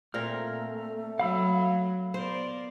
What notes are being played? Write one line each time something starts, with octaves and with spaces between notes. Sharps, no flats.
A#2 A3 C4 A#4 F6
F#3 F5 B5 E6
B3 A#4 C5 D5